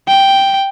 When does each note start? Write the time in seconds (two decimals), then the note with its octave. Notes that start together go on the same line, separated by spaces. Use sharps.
0.08 G5